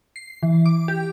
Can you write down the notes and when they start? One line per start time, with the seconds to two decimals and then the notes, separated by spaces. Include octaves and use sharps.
0.16 C7
0.43 E3
0.66 D6
0.88 G4